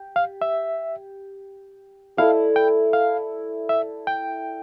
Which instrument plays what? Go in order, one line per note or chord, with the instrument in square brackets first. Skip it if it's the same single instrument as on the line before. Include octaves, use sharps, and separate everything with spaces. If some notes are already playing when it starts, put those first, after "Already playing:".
Already playing: [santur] G4
[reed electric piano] F5
E5
[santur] E4 A4 D5 [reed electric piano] F5
[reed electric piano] G5
F5
E5
G5